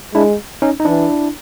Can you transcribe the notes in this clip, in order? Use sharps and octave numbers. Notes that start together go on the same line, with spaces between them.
G#3 D4 E4
C#4 D#4
D#4
E3 D4 E4